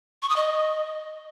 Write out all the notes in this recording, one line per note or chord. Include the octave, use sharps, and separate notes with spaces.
C#6
D#6
D#5